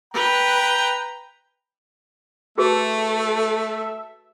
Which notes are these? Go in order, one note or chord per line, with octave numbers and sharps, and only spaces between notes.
B4 G5 A#5
A3 F#4 G#4 A4 B4 E5